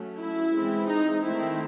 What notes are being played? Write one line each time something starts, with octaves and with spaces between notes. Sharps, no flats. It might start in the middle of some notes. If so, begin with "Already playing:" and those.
Already playing: F#3 A3 C#4
E4
E3 G#3 C4
D#4
D#3 A3 C4 E4